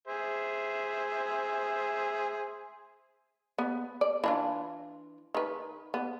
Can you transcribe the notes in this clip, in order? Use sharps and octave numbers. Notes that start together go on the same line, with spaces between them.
G#4 C5 E5
B3
D5
E3 D4 F4
D#3 B4
B3